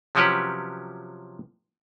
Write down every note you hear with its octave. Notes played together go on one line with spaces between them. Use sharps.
C3 F3 F#3 C#4 G4 B4